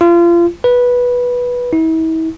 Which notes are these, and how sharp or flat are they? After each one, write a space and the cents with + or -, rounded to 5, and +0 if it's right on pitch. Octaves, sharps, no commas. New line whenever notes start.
F4 -30
B4 -10
E4 -40